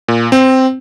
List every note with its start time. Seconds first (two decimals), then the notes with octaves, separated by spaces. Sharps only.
0.08 A#2
0.32 C4